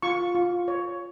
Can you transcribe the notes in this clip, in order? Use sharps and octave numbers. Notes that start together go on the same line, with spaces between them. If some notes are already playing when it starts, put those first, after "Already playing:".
F4 C#6
F4
C#5